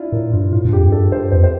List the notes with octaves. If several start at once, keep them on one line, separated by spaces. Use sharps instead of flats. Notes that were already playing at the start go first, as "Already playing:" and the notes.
Already playing: D4 E4 F4
A2 A#4
G2 F4
A2 F4
G2
F2 G4
G2 A4
G2 C5
F2 C5
C5